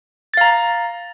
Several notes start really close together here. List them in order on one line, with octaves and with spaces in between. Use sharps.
A6 F5 A#5